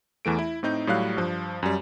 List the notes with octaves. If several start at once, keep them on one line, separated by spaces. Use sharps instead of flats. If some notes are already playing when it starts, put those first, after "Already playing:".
E2 E3 A3 D7
E4
A2 C4 D#4 G6
A2 F#3 G3 F5 F#6
G2 F3
F#2 G3